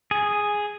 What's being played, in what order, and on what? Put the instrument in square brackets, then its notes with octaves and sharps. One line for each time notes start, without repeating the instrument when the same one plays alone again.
[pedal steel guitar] G#4